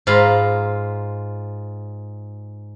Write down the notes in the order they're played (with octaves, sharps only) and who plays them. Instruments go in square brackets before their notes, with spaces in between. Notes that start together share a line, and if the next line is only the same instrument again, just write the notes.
[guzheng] G#2 F4 F5 A#5 B5